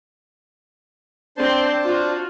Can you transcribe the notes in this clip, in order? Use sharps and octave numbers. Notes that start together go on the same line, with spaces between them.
C4 D4 C5 A5 C6
F4 F#4